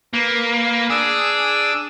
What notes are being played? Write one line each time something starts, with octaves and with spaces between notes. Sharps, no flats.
A#3 B4
D4 G#4 D6 E6